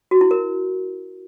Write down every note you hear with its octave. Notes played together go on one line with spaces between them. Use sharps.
F#4
E4
A#4